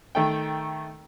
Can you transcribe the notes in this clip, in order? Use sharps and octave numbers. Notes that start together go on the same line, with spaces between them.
D#3 A3 G5